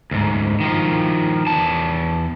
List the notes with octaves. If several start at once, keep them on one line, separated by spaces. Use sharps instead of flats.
D2 G#2
D#3 F3
E2 A5